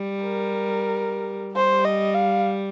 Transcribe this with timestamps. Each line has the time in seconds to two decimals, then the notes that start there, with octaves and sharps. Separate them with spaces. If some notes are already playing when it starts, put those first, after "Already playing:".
Already playing: G3
0.23 A#4
1.55 G3 C5
1.85 D#5
2.14 F5